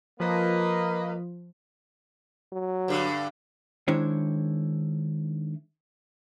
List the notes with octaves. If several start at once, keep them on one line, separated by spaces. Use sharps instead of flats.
F3 A#3 B4 D#5
F#3
G2 D3
D#3 G#3 D4 E4 C5 C#5